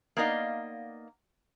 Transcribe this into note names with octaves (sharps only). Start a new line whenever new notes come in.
A#3 B3 D#4 D5 D#5 F5